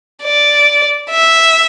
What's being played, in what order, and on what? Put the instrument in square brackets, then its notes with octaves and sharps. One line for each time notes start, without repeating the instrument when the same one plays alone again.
[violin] D5
E5